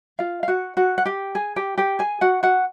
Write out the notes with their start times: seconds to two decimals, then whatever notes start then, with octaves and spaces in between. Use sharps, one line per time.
0.19 F4 F5
0.43 F5
0.48 F#4 F#5
0.77 F#4 F#5
0.98 F#5
1.06 G4 G5
1.35 G#4 G#5
1.56 G4 G5
1.78 G4 G5
1.99 G#4 G#5
2.21 F#4 F#5
2.43 F#4 F#5